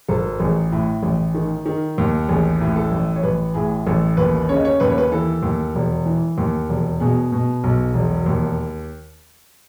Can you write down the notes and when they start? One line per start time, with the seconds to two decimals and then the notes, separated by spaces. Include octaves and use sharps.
0.08 G#1 A4
0.40 A1 G#4
0.72 A2
1.03 A1
1.34 D#3
1.66 D#3
1.98 D#2
2.29 A1 G#4
2.61 A2
2.76 A4
2.92 A1
3.16 C#5
3.23 A1 B4
3.54 A2 G#4
3.86 A1 A4
4.17 D#2 B4
4.49 C#3 C#5
4.56 D#5
4.65 C#5
4.80 D#2 B4
4.89 C#5
4.98 B4
5.12 E3 A4
5.43 D#2
5.75 E1
6.06 E3
6.38 D#2
6.69 E1
7.00 B2 G#4
7.32 B2
7.64 B1
7.94 E1
8.26 D#2